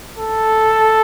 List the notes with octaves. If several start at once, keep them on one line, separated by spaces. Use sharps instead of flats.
A4